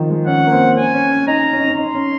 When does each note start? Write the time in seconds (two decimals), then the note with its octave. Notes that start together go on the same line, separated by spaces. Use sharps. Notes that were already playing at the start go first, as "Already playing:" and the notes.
Already playing: D#3 F3
0.10 G#3
0.26 C#4 F#5
0.47 A#3
0.52 C4
0.77 C#4 G#5
0.94 C#4
1.10 C#4
1.27 D#4 A#5
1.53 C#4
1.60 D#4
1.68 C#4
1.77 D#4 C6
1.95 C#4